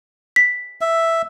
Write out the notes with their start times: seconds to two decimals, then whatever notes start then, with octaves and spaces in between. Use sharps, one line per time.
0.36 B6
0.81 E5